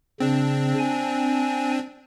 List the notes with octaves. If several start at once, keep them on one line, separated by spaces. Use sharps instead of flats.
C#3 C4 D4
G#5